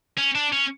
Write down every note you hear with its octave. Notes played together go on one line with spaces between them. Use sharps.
C#4
D4
C#4